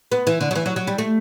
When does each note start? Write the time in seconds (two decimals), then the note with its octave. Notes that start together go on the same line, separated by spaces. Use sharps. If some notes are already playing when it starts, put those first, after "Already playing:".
0.12 B3
0.27 E3
0.41 D3
0.51 F#3
0.55 E3
0.66 F#3
0.76 F#3
0.87 G3
0.98 A3